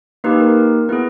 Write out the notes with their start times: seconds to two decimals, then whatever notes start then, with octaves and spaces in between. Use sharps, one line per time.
0.24 A#3 D#4 G4 B4
0.40 A#4
0.89 B3 E4 G#4 B4